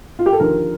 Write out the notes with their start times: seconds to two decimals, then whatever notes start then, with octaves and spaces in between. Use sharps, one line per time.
0.19 F4
0.26 G4
0.33 A4
0.40 D#2 D3 F3 A#4